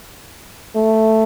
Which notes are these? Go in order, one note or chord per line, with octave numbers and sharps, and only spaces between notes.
A3